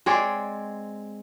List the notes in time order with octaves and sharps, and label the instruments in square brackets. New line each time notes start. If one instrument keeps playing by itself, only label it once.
[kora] G#3 C4 C#5 D5